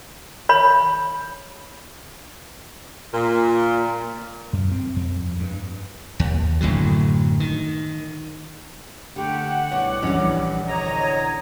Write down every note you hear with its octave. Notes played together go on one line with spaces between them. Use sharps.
C#5 B5
A#2
F#2
C4
F2
G2
D#2
F#1 A2 D3 F#3
D#3
D3 A3 G4 F#5
C2 B2 C#5 D6
A#1 E2 G3 C#4
D2 C#5 D#5 A#5